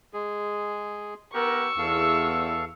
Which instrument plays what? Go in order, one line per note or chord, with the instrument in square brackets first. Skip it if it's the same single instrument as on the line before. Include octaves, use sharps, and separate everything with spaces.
[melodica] G#3 G#4
[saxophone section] B3 G4 A#4 [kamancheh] C#6 E6
[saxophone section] E2 [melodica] A4 F5